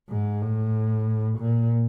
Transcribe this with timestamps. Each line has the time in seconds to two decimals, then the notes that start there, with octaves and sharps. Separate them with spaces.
0.09 G#2
0.41 A2
1.38 A#2